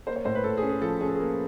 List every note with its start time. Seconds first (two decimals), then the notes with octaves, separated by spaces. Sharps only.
0.07 A#3 C5
0.16 C#5
0.25 A2 C5
0.35 B4
0.44 A2 A4
0.57 G#4
0.62 C#4
0.69 G#4
0.81 F3 A4
1.01 C#4 G#4
1.08 A4
1.15 A#3 G#4